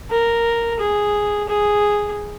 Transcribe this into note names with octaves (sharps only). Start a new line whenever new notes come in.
A#4
G#4
G#4